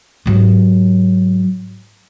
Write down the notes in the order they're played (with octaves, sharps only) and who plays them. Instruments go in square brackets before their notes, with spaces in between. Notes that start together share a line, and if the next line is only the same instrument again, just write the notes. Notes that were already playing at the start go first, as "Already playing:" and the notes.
[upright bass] G#2 F#3